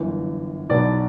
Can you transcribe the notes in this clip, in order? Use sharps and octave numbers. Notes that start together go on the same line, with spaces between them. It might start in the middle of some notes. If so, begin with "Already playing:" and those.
Already playing: G1 F#2 E3
B1 B2 F#3 D5